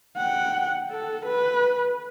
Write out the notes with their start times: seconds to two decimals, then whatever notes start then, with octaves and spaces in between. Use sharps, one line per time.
0.17 F#5 G5
0.92 A4
1.26 B4